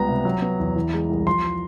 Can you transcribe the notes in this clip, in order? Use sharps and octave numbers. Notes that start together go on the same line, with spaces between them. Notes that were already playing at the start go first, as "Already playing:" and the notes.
Already playing: C#2 G3 B3 A#5
C3
F#3
B3
E2
E3
G#3
C2
F3 C6